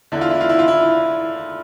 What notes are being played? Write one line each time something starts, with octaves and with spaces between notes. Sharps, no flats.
E2 D3 E4
F4
E4
F4
E4
F4
E4